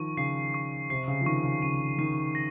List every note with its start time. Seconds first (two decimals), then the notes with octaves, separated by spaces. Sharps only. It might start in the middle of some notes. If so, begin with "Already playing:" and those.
Already playing: D#3 F3 C#6
0.17 C#3 C7
0.54 C#6
0.90 C3 C7
1.08 C#3
1.21 F3
1.26 D#3 C#6
1.44 C#3
1.62 C#3 D#7
1.98 D#3 C7
2.35 A#6